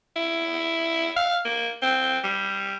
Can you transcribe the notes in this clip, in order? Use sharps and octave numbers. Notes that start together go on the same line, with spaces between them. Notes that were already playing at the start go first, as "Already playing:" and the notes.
E4
F5
A#3
C4
G3